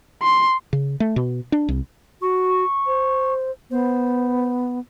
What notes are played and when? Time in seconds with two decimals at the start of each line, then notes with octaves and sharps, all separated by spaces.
0.22 C6
0.73 C#3
1.00 A3
1.16 B2
1.52 D4
1.69 C2
2.22 F#4 C#6
2.87 C5
3.71 B3 C5